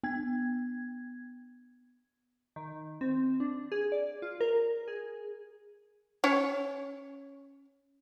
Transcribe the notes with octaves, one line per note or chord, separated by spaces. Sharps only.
B3 G#6
D#3
C4
D4
G#4
D5
F4
A#4
G#4
C#4 C#5